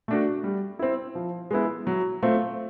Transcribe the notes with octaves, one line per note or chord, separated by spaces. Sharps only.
A3 D4 F#4
G3
C4 E4
F3
G#3 B3 E4
F#3
A3 C4 F4